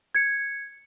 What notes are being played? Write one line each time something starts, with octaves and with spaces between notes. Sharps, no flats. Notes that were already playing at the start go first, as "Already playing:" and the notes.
G#6 C#7